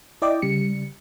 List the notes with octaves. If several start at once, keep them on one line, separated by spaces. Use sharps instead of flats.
E4 D5 D#5 G5 D6
C#3 G3 C#7